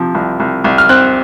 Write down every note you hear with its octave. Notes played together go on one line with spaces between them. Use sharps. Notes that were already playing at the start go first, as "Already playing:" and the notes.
Already playing: C3 F3
C2
C2
C2
F6
C4 F#6